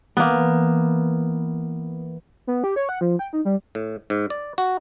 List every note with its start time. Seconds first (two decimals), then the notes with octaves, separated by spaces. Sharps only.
0.17 E3 A#3 B3
2.47 B3
2.64 G4
2.76 C#5
2.89 F#5
3.01 F3
3.19 G5
3.33 D#4
3.45 G3
3.75 A2
4.10 G#2
4.30 D5
4.58 F#4